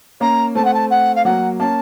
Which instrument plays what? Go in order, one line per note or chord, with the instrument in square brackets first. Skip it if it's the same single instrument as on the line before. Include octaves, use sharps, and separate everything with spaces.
[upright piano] A#3 C#4 [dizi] A#5
[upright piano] A3 C4 [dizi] A5
[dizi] F#5
A5
F#5
F5
[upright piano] F#3 A#3 [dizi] F#5
[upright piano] A#3 C#4 [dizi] A5